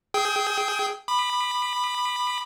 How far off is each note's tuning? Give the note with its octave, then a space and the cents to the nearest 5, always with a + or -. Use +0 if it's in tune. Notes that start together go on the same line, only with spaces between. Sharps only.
G#4 +0 G5 +0 D#6 +40
B5 +0 D6 +40